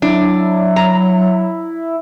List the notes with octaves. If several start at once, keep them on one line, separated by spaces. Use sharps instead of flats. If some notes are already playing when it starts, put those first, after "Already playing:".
F#3 D4 E4
A#5